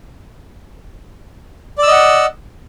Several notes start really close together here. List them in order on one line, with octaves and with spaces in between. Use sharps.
D5 E6 D#5 F#5